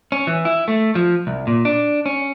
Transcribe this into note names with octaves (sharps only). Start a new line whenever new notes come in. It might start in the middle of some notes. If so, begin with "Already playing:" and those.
C#4
E3
E4
A3
F3
C2
A#2
D4
C#4